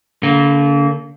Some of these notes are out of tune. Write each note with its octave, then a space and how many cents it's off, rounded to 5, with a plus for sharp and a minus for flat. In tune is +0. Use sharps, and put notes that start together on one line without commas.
D3 -45 A#3 -5